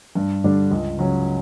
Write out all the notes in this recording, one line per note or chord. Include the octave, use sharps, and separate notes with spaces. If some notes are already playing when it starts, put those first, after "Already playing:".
G2
D3 G3 D4
C#2
C#3 F#3 C#4